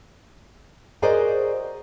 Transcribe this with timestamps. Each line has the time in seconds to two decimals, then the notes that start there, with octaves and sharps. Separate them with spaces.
1.02 F#4 G#4 A#4 C5 D5 D#5